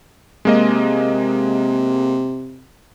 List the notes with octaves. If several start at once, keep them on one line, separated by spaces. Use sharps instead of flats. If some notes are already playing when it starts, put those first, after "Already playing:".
C3 G#3 A#3 D#5